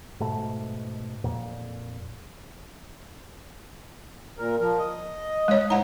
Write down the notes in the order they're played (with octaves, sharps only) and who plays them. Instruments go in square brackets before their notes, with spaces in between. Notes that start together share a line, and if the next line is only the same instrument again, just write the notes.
[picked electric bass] G#2 B2 A3
F2 A#2
[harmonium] A#2 A#4
F3 A#4
D#5
[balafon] G#3 C#5
[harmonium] G#2 D#4 E4 [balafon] F#5 A#5